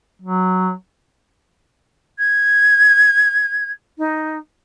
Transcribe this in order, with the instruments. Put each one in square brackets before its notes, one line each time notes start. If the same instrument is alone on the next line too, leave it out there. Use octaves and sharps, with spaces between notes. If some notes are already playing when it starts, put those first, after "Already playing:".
[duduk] F#3
[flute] G#6
D#4